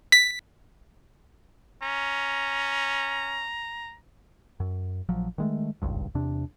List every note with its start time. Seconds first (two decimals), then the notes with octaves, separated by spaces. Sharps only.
0.12 B6
1.82 C#4 A#5
4.60 F#2
5.09 A#1 F3 F#3
5.38 D#3 G#3 A3
5.82 D#1 G#1 C#2 G2
6.15 E2 C3 D4